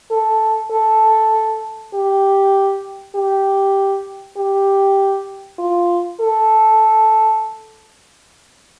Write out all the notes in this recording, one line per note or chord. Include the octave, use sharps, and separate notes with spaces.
A4
A4
G4
G4
G4
F4
A4